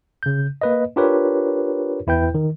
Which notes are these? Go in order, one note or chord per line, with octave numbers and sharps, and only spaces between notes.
C#3 G6
A#3 B4 D#5
D4 F4 G4 A#4 B4 C#5
E2 E4 B4 G5 G6
D#3